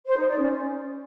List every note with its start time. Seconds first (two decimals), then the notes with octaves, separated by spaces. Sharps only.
0.06 C5
0.17 D#4
0.28 D5
0.38 C#4